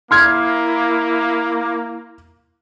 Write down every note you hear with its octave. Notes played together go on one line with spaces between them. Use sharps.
A#3 E4 C6 F6 G#6